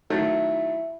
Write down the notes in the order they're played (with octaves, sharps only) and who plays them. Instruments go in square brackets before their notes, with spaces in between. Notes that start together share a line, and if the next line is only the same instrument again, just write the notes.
[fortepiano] D#3 F#3 A3 [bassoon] E4